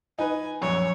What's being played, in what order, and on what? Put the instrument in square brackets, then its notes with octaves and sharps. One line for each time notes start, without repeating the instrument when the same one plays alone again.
[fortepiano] D#4 B4 [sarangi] G#5
[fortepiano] A#1 F#2 [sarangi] C#5